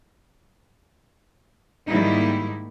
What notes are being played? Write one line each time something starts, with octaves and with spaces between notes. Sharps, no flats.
G#2 D#3 G3 A#3 D#4 E4